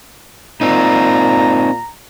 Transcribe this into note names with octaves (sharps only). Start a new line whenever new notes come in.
A#2 C4 D#4 A#5